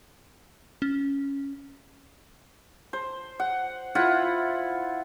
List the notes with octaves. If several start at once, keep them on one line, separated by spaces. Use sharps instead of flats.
C#4
C5
F#5
E4 F4 E5 F#5